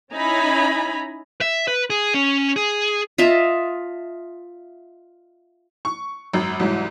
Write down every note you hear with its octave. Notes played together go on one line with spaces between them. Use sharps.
C#4 D#4 E4 G#5 A#5 B5
E5
B4
G#4
C#4
G#4
F4 D#5 E5 A5
C#6
G#1 F#2
C2 G#2 E3 F#3